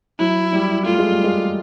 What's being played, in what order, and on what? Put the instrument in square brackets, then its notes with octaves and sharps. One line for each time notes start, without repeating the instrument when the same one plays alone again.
[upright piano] F#3 [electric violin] E4
[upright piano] G3
[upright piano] A3 [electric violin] F4
[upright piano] G#3
G3
G#3